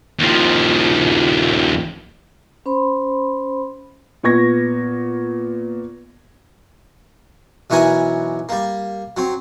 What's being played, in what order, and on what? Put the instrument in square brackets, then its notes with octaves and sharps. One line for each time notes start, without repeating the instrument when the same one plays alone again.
[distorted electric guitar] D#2 F3
[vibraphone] C#4 C5 B5 C6
[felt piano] A#2 B3 C#6 G#6 A#6
[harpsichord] B1 E3 F#4 A#4 G#5 B5
G3 A#3
F#3 C4